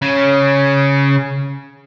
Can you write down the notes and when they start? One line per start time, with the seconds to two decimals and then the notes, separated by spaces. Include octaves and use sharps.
0.02 C#3 C#4